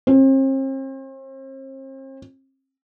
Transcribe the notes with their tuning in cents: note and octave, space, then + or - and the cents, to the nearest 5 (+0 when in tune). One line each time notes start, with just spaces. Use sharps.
C4 +40